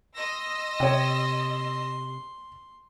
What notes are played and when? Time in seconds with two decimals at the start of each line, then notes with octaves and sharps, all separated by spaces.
0.16 D#5 C6 E6 A#6
0.80 C3 C#5 G5